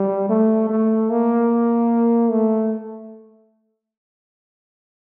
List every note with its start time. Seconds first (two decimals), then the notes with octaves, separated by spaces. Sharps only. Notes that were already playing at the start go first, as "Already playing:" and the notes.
Already playing: G3
0.29 A3
0.69 A3
1.10 A#3
2.31 A3